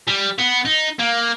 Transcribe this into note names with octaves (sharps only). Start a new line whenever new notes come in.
G3
B3
D#4
A#3